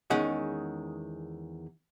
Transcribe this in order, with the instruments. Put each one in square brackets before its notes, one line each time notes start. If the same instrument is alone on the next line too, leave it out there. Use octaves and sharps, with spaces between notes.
[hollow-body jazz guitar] E2 D#3 G#3 C#4 F#5